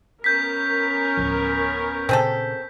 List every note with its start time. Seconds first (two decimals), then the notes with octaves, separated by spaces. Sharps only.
0.24 B3 C#4 A#4 G6 B6
1.17 D1 C#2 F3
2.09 A#2 C#3 C4 G#4 A4